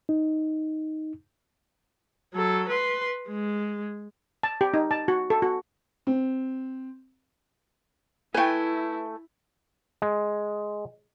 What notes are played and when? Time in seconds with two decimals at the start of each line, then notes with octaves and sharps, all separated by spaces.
0.09 D#4
2.34 F#3 A4
2.68 B4 C6
3.28 G#3
4.43 A5
4.61 G4
4.74 D#4
4.91 A5
5.08 F#4
5.30 A4
5.42 F#4
6.07 C4
8.34 A3 E4 B4 G5 G#5
10.02 G#3